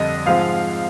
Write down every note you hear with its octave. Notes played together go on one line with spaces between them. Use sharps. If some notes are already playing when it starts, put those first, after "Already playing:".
Already playing: F2 D3 G3 D#5
G#2 F3 G#3 C4 F5